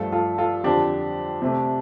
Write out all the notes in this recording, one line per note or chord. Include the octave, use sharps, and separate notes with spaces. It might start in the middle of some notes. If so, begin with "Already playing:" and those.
Already playing: G2 F3 A3 F4 A4
F4 A4
F4 A4
F2 D3 F3 D4 G4
C3 A3